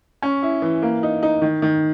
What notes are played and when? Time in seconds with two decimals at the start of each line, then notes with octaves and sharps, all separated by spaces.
0.22 C#4
0.42 E4
0.62 E3
0.82 A#3
1.03 D#4
1.23 D#4
1.42 D#3
1.62 D#3